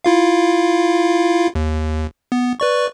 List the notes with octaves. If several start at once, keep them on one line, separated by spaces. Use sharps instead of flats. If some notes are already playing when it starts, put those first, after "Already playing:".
E4 F4 F5
D#2
B3
B4 D5 C#6